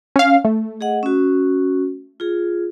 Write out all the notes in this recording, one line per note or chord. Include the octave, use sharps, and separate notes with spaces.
C#4 F5
A3
G#4 D#5 F#5
C#4 F#4
F4 G#4